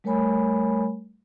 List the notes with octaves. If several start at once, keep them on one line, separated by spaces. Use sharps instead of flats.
G3 A3 A#4 C#5 G#5 B5